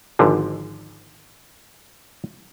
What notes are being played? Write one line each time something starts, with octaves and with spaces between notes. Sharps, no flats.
G#1 G#2 D3 F3